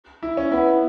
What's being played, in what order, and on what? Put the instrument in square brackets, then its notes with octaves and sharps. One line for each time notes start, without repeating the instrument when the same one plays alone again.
[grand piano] E4
C#4
[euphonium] B3 [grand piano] E4